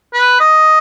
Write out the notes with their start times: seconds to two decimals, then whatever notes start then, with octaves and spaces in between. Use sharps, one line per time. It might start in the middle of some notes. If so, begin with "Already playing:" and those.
0.13 B4
0.40 D#5